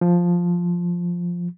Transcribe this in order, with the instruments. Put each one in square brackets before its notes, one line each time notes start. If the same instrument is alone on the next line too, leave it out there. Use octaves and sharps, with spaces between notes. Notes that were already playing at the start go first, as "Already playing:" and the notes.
[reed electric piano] F3